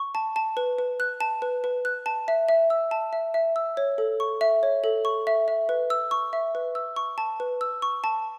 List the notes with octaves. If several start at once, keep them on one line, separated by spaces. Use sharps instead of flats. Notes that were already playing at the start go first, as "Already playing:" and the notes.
Already playing: C#6
A5
A5
B4
B4
F#6
A5
B4
B4
F#6
A5
E5
E5
E6
A5
E5
E5
E6
C#5
A4
C#6
E5
C#5
A4
C#6
E5
E5
B4
E6
C#6
E5
B4
E6
C#6
A5
B4
E6
C#6
A5